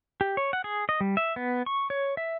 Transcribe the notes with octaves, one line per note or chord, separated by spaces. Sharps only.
G4
C#5
F#5
G#4
D#5
G3
E5
B3
C#6
C#5
E5